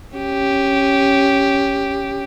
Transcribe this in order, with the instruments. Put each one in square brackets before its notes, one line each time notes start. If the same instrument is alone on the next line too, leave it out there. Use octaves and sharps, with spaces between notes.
[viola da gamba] C#4 G4